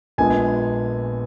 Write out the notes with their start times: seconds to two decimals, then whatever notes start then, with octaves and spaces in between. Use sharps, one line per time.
0.18 A#1 A#2 G#3 B3 G#5